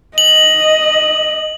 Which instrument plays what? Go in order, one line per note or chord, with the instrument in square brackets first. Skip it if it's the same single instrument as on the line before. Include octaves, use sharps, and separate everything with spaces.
[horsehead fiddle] D#5 [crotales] F#7